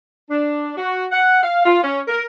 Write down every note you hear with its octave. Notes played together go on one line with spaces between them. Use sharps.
D4
F#4
F#5
F5
F4
C#4
A#4